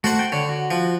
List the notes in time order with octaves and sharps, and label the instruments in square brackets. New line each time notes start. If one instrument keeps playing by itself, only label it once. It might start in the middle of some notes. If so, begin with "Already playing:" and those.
[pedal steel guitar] A3 [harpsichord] F#4 C5 F#5
[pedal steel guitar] G5
[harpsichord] D3 [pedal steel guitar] C#5
[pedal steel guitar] F#4
[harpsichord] F3